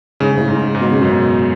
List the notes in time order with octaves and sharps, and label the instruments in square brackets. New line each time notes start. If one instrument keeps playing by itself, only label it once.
[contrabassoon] G#2 [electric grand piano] C#3
[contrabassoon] G#2
A2
[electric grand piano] G#2
[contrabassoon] G#2
[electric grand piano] G#2
[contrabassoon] B2
C#3
[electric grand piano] F#2 [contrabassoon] B2